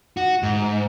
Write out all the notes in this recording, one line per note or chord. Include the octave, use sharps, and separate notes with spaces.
F#4
G#2